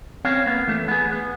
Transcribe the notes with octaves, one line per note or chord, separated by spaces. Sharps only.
C4 C#4 C#5 F5
A#3 B3
E3 A3
B3 G#4
B3